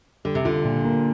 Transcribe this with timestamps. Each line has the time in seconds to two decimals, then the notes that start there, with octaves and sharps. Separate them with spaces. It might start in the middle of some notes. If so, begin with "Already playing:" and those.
0.25 D3 G3
0.35 C3
0.45 D3 F4
0.65 A#2
0.85 A#3